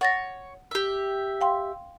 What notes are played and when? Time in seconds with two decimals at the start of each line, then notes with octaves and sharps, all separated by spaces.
0.01 C#5 F#5 A6 A#6
0.71 G4 E5
1.41 F5 G5 C6